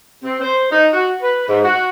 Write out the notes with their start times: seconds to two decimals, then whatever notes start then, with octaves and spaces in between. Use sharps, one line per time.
0.22 C4
0.41 C5
0.70 D#4
0.92 F#4
1.21 B4
1.48 G#2
1.63 F#4